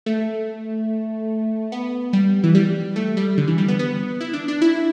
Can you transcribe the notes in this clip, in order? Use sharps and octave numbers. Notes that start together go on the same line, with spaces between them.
A3
B3
G3
E3
G3
A3
G3
D3
E3
G3
B3
B3
E4
D4
D4
E4